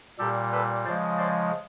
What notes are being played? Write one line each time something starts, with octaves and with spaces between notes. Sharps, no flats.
A#2 G3 G4 A4
A4 B4
C#3 F3 G#3 C5 D5
C5 D5